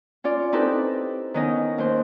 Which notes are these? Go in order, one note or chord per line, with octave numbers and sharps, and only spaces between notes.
C#4 F4 D5
C4 D#4 E4 G4 A4 B4
D#3 B3 C#4 D#4 D#5
D#2 C5